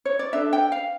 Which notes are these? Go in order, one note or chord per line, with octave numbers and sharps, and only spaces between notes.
C#5
D5
D4 A4 E5
G5
F5